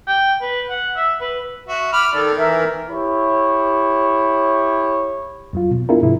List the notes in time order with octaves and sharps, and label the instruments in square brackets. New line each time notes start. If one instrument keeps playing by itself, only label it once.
[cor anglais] G5
B4
F#5
E5
B4
[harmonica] F#4 E5
B5 D6 F6
[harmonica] D#3 [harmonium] A4 D5
[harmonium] E3 A#4 E5
[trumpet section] E4 G4 C#5
[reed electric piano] F2 F#3 F4
B2
B3 D4 E4 F4 G#4 A#4
G#2 C3 F3 E4